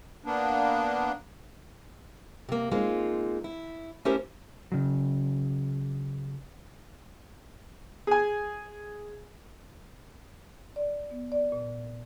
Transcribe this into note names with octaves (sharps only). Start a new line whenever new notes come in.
A#3 B3 D4
C3 A#3
G#3 A#3 C4 D#4 F4
E4
A3 C#4 E4 G4 A#4 C5
C#3 F#3
G#4 G#5
D5
B3
D5
A#2